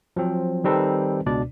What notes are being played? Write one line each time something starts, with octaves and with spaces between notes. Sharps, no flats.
F3 F#3 C4
D#3 G3 C4 D#4 A4 B4
C#2 B2 D4 D5